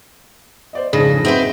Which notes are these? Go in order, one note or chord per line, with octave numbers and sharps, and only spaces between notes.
C5 D5 D#5
F2 G#2 C#3 G#4 A#6
C4 D#4 F#4 B4 C5 E5